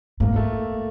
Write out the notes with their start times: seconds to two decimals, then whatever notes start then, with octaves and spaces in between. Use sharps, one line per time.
0.20 G#2 A#3
0.36 A3